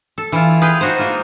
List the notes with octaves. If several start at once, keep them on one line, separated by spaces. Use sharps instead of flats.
A4
E3 E4 F4
G#4 B4 F5 G5
D#4 F#4 C5
G#3 A#3 F4